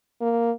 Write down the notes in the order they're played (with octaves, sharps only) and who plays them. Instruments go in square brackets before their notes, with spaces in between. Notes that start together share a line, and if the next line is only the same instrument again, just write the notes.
[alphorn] A#3